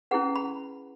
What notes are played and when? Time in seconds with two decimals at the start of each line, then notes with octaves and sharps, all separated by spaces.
0.11 C#4 E4 G#4 B4 F#5
0.36 B5